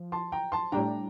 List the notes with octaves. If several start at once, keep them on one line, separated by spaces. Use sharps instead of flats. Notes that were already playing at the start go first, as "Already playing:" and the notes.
Already playing: F3
A5 C6
G5 A#5
A5 C6
A2 G3 D4 G5 A#5